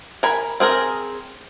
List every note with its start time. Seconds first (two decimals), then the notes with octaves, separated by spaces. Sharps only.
0.23 A#4 G#5 B5
0.60 C4 G#4 A#4